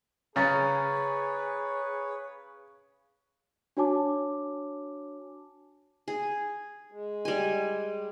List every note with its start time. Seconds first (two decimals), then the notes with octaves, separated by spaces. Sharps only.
0.36 C#3 C#4 G#4 B4 C#5 A#5 A6
3.77 D4 F#4 C#5 G#5 A5 D6
6.08 G#4
6.92 G#3
7.25 G3 G#5